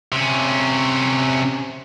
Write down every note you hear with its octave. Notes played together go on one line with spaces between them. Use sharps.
C3 C#4